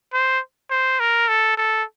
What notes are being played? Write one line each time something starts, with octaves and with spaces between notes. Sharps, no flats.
C5
C5
A#4
A4
A4